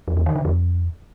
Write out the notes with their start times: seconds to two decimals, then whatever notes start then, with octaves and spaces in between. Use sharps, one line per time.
0.08 F2
0.17 E2
0.26 D#3
0.36 D3
0.45 F2